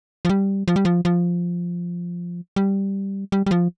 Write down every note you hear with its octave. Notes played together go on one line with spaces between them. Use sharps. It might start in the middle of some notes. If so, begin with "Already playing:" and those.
F3
G3
F3
G3
F3
F3
G3
G3
G3
F3